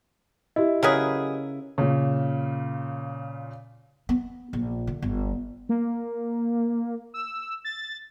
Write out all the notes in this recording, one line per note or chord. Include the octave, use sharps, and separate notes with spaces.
E4 G4 D#5
C#3 F#3 G#4 A#4 B4
A#2 C#3
B3
A#1
D3
G1
A#3
E6
A6